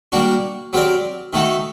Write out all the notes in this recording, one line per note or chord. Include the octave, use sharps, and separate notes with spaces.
G3 A#3 D4 F#4
F#3 C4 G4 A#4 D5
D#3 A3 D#4 F#4 A4